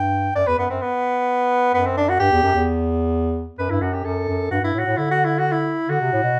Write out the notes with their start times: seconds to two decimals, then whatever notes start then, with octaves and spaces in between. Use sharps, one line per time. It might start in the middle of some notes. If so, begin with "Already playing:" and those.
Already playing: G2 G5
0.35 F#2 D5
0.47 E2 B4
0.58 F#2 B3
0.69 F#2 C4
0.82 B3
1.74 F#2 B3
1.86 C4
1.97 D4
2.09 F#4
2.20 G2 G4
2.31 E2
2.43 F#2
2.54 E2
3.58 F#2 B4
3.70 G2 E4
3.80 F#2 F#4
3.93 G4
4.04 F#2 A4
4.28 F#2
4.51 G2 F#4
4.62 G2 E4
4.74 A2
4.79 F#4
4.85 A2
4.97 D3 E4
5.11 F#4
5.24 E4
5.38 F#4
5.52 E4
5.89 D3 F#4
6.01 C3
6.12 A2
6.23 B2